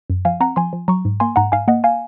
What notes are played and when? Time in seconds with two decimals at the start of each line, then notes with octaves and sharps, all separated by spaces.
0.10 F#2
0.25 F3 F5 G#5
0.40 C4 F#5 A#5
0.56 F3 G#5 C6
0.73 F3
0.88 F#3 A#5 C#6
1.05 G#2
1.20 A#3 G#5 C6
1.36 G#2 F#5 A#5
1.52 G#2 F5 G#5
1.68 A#3 D#5 F#5
1.84 F5 G#5